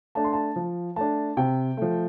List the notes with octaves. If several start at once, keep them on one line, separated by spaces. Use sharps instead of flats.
A3 D4 A5
C6
A5
F3
A3 D4 A5
C3 G5
F3 A3